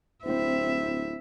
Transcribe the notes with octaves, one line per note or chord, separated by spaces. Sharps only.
D1 C4 E4 E5